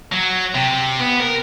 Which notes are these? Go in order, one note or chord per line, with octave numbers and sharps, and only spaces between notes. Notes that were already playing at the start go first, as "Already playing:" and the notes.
F#3
C3
B3
A#4